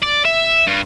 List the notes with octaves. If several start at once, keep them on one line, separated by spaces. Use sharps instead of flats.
D5
E5
G2